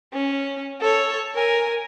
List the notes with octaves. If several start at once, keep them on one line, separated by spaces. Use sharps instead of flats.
C#4
A4 C#5
A#4 G#5